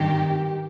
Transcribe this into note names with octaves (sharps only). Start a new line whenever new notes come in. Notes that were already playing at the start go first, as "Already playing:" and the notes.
Already playing: G#1 G2 D#3 G4